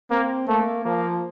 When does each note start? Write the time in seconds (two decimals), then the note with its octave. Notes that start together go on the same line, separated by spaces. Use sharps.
0.10 A#3 C4
0.48 A3 A#3
0.85 F3 A#3